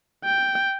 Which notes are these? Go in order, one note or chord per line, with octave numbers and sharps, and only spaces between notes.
G5